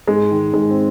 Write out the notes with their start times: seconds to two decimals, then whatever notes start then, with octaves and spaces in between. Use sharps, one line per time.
0.08 G#2 G#3
0.31 D#3
0.53 G#2 G#3
0.70 C4